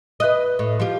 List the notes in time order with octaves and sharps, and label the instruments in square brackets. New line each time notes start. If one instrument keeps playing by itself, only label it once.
[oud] B4 D#5
A2
F3 F4 G4